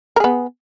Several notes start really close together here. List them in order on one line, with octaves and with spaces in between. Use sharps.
A#4 G#4 B3